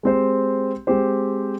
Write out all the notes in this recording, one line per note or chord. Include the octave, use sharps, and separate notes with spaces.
G#3 C4 G4 C5
G#3 C4 G4 C5